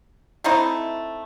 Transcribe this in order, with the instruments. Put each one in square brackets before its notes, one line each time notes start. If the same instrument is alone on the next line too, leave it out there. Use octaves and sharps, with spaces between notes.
[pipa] A3 C4 D#4 E4